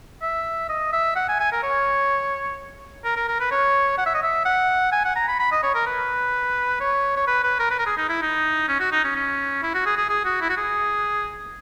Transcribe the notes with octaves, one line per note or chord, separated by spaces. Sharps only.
E5
D#5
E5
F#5
G#5
G#5
A#4
C#5
A#4
A#4
A#4
B4
C#5
F#5
E5
D#5
E5
F#5
G#5
F#5
A#5
B5
B5
D#5
C#5
A#4
B4
C#5
C#5
B4
B4
A#4
B4
A#4
G#4
D#4
E4
D#4
C#4
F#4
D#4
C#4
C#4
E4
F#4
G#4
G#4
G#4
F#4
E4
F#4
G#4